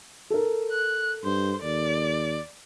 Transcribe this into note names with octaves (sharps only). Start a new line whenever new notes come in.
A4 A#4
F#6
G2 C5
D#2 D5